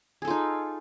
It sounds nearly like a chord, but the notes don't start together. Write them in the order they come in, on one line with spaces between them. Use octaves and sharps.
G#4 A4 F4 D#4